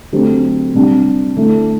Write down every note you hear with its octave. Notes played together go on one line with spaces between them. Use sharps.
D3 F#3 A3 C4 G4
C3 G3 D4
D3 A3 E4